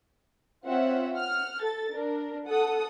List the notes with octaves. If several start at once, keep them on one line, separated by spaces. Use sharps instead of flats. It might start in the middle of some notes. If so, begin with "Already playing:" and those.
C4 F4 C#5 E5 F#5
F#5 F6
A4 A6
D4 A#4
A4 F#5 D#6